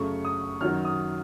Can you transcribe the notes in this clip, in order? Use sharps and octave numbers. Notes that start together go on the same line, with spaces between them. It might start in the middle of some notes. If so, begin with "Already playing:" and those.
Already playing: F#2 C#3 A3 C#6
D#6
F#2 D#3 F#3 F6
D#6